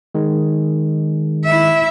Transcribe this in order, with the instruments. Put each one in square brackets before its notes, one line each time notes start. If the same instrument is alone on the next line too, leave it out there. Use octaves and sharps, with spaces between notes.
[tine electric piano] D#3 G#3
[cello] E4 E5